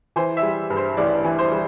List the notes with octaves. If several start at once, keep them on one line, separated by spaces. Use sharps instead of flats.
E3 C5
E5
G3
G2
C5
A1 D5
E3
C5
G3